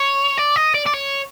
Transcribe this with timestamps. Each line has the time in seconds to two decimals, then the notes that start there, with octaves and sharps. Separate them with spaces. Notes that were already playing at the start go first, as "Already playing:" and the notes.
Already playing: C#5
0.38 D5
0.56 D#5
0.74 D5
0.86 D5
0.93 C#5